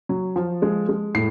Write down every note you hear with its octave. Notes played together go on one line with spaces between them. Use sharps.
F#3
F3
G#3
G#3
A2 C7